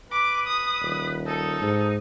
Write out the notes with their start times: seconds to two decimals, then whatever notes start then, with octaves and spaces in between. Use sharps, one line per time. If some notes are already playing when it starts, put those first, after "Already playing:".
0.12 B4 D6
0.47 D#6
0.81 D#1
1.27 D#4 A4
1.62 G#2